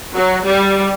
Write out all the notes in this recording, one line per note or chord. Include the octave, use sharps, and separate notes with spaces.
F#3
G3